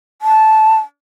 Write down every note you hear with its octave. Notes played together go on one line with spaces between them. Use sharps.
A5